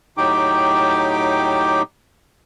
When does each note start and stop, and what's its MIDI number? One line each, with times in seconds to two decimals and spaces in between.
0.17 1.82 45
0.17 1.82 54
0.17 1.82 63
0.17 1.82 67
0.17 1.82 79
0.17 1.82 86